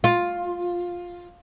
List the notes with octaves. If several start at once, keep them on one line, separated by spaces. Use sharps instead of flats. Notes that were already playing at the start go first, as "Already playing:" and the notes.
F4